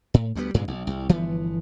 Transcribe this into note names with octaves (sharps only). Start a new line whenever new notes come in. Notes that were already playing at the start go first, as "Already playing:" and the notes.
A2
D2 G3 B3
G2 A#2 C#3 G#3
B1
C2
G1 E3 F3 B3